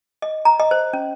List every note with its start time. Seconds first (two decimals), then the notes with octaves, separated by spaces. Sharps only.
0.22 D#5
0.45 A#5
0.60 D#5
0.71 C5
0.93 C#4